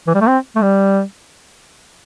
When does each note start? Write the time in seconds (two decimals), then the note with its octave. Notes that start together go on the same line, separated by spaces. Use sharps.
0.07 E3
0.15 G3
0.21 A3
0.28 C4
0.56 A3
0.62 G3